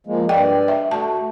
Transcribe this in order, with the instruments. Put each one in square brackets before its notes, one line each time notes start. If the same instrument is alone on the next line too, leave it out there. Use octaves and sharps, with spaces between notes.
[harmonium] F3 G#3 A#3
[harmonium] G2 D5 [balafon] G5
[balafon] E5
[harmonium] A3 F#4 [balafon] A5